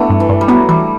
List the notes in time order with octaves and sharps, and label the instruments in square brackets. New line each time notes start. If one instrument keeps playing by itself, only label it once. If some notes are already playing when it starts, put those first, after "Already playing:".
Already playing: [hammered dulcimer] A3 D4 E4 [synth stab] B3
[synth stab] G2
[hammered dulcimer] E3
[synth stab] G2
[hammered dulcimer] G3
[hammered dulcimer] F#3 [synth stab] B3
[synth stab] E3 [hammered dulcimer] G3